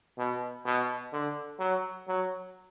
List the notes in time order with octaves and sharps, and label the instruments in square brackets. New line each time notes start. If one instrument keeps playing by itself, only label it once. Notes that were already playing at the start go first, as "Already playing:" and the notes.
[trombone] B2
B2
D3
F#3
F#3